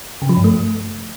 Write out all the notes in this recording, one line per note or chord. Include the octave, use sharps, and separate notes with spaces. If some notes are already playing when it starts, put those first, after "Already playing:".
C#3
F3
G2
A3